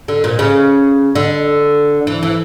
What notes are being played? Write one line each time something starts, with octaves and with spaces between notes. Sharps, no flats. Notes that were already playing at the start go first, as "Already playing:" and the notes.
D3
A#2
C#3
D3
E3
E3